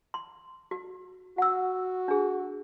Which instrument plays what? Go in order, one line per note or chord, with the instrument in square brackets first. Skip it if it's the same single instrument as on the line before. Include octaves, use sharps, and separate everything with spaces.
[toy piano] C6
F#4
[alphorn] F#4 [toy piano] F#5 E6
[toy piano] D4 G#4